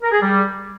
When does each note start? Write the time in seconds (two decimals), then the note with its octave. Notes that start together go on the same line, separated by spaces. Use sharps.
0.02 A#4
0.12 G#4
0.21 G3